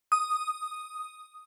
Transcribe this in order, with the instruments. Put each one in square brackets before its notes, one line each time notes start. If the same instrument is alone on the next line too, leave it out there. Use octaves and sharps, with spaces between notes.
[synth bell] D#6